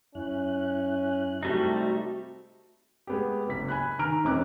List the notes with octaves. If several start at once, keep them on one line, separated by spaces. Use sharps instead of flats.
F#2 C#4 E4 F#6
C3 G3 A3 D#4 F#4
G#3 B3 G4
F#1 B6
G#5 B5 F#6
D#3 A#5 F6 D7
E1 C4 C#4 D6 F#6